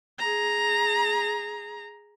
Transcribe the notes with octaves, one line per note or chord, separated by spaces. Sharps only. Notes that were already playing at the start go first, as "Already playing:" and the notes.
G#4 A#5